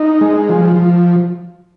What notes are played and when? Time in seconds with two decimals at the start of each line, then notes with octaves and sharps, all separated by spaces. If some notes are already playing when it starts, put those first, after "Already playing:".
Already playing: D#4
0.21 G#3
0.49 F3
0.76 F3